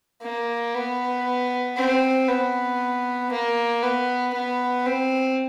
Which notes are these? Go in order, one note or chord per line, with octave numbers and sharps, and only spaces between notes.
A#3
B3
C4
B3
A#3
B3
B3
C4